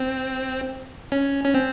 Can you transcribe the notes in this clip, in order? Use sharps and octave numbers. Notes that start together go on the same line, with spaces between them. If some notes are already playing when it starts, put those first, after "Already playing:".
Already playing: C4
C#4
C#4
C4